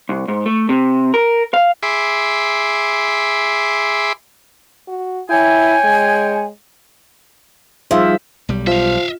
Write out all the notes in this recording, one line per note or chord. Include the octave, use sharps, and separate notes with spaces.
C2
G#2
A3
C3
A#4
F5
G#4 E5 B5 C6 D6
F#4
E4 C#5 G5 G#5
G#3
F3 G3 D#4 G#4 C5 E5 F5
B1 G3
F3 F4 E5 F5